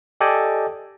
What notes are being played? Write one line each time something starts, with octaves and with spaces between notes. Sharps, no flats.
G4 A4 D5 D#5 G5 G#5